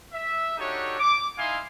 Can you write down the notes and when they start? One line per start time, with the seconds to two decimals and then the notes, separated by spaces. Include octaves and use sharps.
0.13 E5
0.57 D4 D#4 F#4 G4 A4 C#5
0.99 D6
1.37 D#4 E4 E5 F5 G#5 C6